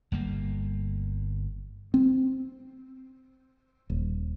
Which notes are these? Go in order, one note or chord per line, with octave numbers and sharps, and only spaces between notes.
G1 G3 A#3
C4
D#1